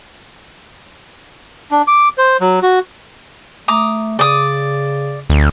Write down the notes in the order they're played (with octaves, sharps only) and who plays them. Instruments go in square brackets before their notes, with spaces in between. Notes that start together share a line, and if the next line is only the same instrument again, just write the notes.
[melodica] D4
D6
C5
F#3
F#4
[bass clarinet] A3 [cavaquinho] A#5 D6 D#6
[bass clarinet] C#3 [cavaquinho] D5 D#6
[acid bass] D2